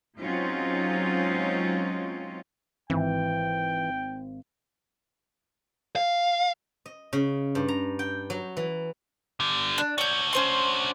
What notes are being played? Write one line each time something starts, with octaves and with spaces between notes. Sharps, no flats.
F#3 G#3 C4 C#4 D#4 F4
G#1 E3 G5
F5
D#5
C#3
G2
A#5
G5
F#3
E3
D3 G3
D4
D4 F#4 C#5 G6
C#4 C5 C6